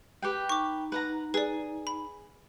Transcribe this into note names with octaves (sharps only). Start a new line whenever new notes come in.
G4 B4 G5
D#4 C#6 D6
B4 F#5 A#5
G#4 B4 D5
B5